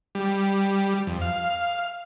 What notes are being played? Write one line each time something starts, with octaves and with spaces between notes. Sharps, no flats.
G3
F2
F5